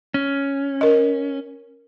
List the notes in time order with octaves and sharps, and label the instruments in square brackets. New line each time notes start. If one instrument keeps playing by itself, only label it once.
[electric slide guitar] C#4
[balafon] A#4 D#5